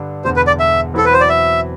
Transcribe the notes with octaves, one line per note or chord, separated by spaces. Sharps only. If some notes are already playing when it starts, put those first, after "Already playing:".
Already playing: G2 D3 G3 D4
E1 E2 D3 C5
B4
D5
E5
E2 B2 F#3 C4 E4 A4
B4
C5
D5
E5